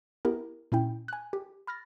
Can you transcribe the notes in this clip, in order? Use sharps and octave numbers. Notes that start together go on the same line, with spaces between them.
B3 E4 G4 A#4
A#2 C#4 E4 G5
G#5 F#6
G4
B5 F6 A6 A#6